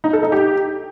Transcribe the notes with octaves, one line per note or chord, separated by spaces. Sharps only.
D#4
A4
D#4
G4